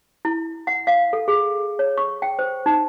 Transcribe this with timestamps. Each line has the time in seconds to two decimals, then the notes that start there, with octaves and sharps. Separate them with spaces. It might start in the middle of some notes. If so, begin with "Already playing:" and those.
0.25 E4
0.67 F#5
0.87 F5
1.13 A4
1.28 G#4
1.79 C#5
1.98 C#6
2.22 G5
2.39 C5
2.66 D#4